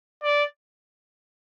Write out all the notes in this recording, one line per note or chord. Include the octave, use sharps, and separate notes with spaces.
D5